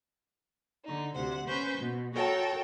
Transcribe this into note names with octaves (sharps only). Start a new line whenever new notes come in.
D3 D#4
D2 C3 C5 F#5
C#4 B4 C5 C#6 G6
B2
F#4 A4 A#4 C#5 G5 A5